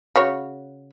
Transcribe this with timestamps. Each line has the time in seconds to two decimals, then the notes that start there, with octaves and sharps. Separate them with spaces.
0.16 C#3 F#4 C#5